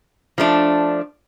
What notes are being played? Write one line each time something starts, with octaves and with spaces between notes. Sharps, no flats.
F3 A3 D4